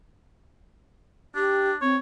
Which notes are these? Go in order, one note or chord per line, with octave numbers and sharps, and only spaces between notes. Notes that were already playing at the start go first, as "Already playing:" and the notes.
D4 G4
C4 C#5